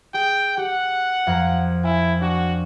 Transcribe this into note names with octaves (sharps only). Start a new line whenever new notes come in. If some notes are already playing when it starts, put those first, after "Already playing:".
G#4 G5
G4 F#5
F2 A#4
E4 G#5
D4 F#4